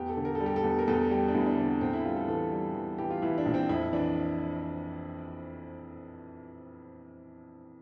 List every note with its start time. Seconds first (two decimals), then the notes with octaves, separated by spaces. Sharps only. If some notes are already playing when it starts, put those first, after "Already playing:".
Already playing: E2 G4
0.09 A4
0.17 D3
0.25 A#4
0.35 A4
0.40 G3
0.46 G4
0.56 A4
0.64 E2
0.79 A#4
0.88 E2 A4
1.11 G3 G4
1.28 D4
1.34 E2 E4
1.46 D4
1.57 D3 C4
1.81 A2 C4
1.93 E4
2.05 G3 F4
2.17 A4
2.28 E3 A4
2.52 G3
2.75 E3
2.98 E3 G4
3.10 F4
3.22 E3 E4
3.38 D4
3.46 A#1
3.54 C4
3.69 F2 E4
3.93 E3 D4